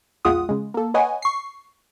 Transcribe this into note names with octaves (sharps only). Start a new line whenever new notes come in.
A#1 E2 G#3 F4 F#5 D#6
C#3 G#3
A#3 A4
B4 C#5 D#5 F#5 G#5
C#6 C7